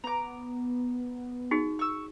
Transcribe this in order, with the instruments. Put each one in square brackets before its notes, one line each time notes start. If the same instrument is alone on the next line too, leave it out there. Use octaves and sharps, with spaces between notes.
[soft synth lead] B3 [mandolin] A#5 D6
[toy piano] D#4 F#4 G#4
[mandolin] C#6 E6